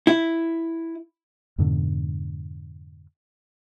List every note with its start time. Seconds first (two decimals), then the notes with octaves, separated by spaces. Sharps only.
0.07 E4
1.58 F2 G#2 B2 D3